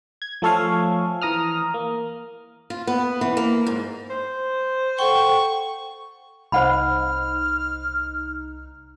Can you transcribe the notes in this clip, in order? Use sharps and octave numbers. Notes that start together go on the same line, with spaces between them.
G#6
F3 A3 A4 C#5 F5 G#5
E3 A#5 D#6 F6
A#3
F4
B3
E3
A#3
G#2
C5
A4 F#5 G5 C#6
C2 D#4 C5 F#5 B5 F6